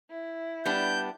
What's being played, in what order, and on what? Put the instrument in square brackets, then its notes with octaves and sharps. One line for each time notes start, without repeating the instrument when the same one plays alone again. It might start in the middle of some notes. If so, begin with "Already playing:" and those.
[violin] E4
[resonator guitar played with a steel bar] G3 B3 D4 [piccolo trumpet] G6